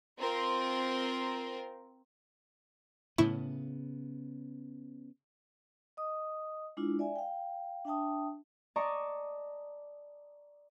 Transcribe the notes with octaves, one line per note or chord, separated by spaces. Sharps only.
C4 F4 A#4 C5
A2 C#3 B3 E4 C#6
D#5 D#6
G#3 D4 E4 F4
D5 E5 G#5
F5 G5
D4 E5 G5 A5 D#6
D5 D#5 A5 A#5 C#6 D6